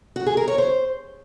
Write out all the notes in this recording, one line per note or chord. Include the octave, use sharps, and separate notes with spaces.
F#4
G#4
A#4
C#5
C5